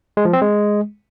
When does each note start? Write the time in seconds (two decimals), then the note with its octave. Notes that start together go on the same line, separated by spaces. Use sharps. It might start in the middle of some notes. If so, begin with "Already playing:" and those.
0.17 G#3
0.25 F3
0.33 C4
0.41 G#3